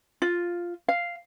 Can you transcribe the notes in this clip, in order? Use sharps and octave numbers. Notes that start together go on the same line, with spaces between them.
F4
F5